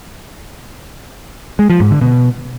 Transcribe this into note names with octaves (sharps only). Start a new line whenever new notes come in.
G#3
F3
G#2
D3
B2